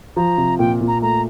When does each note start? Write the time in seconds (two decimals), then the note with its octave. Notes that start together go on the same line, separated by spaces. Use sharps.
0.16 F3 A#5
0.38 C3
0.59 A#2 G5
0.81 A#2
0.88 A#5
1.02 A3 A#5